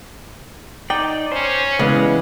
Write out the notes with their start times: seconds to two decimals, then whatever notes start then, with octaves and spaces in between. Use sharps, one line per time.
0.90 D#4 D5 G5
1.32 C#4 C5
1.79 C#3 E3 G#3 B3 G#4 D5